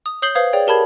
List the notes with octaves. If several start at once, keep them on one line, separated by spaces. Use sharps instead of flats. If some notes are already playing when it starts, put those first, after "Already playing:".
D#6
C#5 D#6 G6 C7 F#7 G7
B4 C5 F5 D#6 G#6
G#4 C#5 D5 G5
G4 A#4 A5 B5 G#6